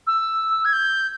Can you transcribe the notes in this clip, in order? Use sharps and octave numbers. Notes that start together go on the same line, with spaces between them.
E6
G#6
G6